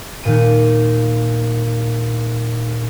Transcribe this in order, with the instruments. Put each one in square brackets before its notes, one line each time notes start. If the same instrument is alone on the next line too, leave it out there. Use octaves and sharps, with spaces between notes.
[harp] D#2 A#2 D#7